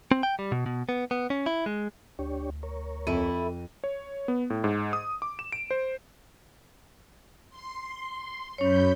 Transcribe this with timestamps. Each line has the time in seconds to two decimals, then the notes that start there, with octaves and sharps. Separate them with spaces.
0.11 C4
0.23 G5
0.39 G3
0.52 B2
0.66 B2
0.89 B3
1.11 B3
1.30 C#4
1.46 E4
1.66 G#3
2.19 D2 D4 G4 C#5
2.63 A#4 C#5
3.07 F2 A3 E4 D#7
3.84 C#5
4.28 B3
4.50 A2
4.64 G#2
4.93 D#6
5.22 D6
5.39 E7
5.52 D7
5.71 C5
7.50 C6
8.58 F#2 C#4 C#5 B5 G6